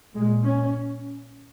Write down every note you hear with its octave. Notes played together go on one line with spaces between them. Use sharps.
A#2 G#3
C#4